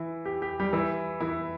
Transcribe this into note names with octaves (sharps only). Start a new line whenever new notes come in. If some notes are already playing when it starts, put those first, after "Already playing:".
Already playing: E3 E4
G4
G4
G3 G4
E3 E4
E3 E4